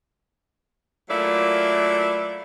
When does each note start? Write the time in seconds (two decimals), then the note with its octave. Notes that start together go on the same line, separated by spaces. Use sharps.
1.09 F#3 A3 A#3 E4 F4 D5